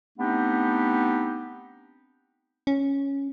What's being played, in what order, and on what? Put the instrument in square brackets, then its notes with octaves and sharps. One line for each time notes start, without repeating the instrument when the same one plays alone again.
[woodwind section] A3 B3 C4 D4 D#4 G4
[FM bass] C#4